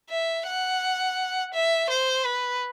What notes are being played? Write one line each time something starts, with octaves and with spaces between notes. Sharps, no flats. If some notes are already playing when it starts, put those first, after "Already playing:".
E5
F#5
E5
C5
B4